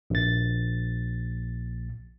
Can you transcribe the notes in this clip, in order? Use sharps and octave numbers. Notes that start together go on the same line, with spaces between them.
A#1 A6